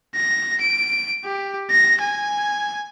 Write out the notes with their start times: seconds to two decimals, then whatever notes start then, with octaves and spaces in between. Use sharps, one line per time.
0.15 A#6
0.61 D7
1.24 G4
1.71 A#6
2.01 G#5